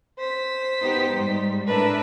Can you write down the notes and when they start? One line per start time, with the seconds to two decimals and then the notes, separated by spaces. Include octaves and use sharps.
0.19 C5 B6
0.82 B3 D#4 G4
1.15 G#2 G3
1.67 A2 D4 A#4 B4 E5